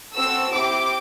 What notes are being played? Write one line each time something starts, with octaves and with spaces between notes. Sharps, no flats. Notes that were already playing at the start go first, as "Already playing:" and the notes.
C4 F#4 A4 E6
C4 E4 G4 D6